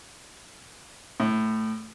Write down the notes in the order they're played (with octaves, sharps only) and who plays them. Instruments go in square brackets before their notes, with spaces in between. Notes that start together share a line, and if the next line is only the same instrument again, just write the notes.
[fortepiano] A2